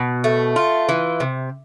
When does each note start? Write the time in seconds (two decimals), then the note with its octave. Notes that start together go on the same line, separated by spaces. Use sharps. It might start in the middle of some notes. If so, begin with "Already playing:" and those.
Already playing: B2
0.24 A3
0.56 F4
0.89 E3
1.20 C3